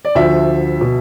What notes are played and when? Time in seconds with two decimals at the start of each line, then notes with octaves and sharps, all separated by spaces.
0.05 D5
0.15 D2 D3 F3 E5
0.81 B2